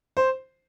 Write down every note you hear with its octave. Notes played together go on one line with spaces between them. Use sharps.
C5